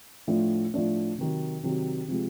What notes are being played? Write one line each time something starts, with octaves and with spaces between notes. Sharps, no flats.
A2 F3 A3 D4
A2 F3 A3 D4
C3 D#3 F#3
C3 D#3 F#3
C3 F3 G#3